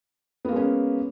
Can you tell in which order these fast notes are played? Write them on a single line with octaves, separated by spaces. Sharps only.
B3 A#3 G#3 C#4